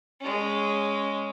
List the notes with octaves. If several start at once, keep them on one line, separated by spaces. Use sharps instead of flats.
G#3 C#4